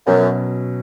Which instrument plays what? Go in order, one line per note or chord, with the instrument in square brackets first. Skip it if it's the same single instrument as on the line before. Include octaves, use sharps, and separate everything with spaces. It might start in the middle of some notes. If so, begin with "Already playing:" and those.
[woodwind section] F#2 [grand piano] B2 F#3 C#4